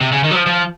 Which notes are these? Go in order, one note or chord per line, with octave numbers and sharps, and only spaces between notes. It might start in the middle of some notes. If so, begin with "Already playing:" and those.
C3
C#3
D#3
F#3
F3
F3